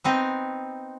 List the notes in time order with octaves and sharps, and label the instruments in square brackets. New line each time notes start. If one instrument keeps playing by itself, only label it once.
[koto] B3 C4 D#4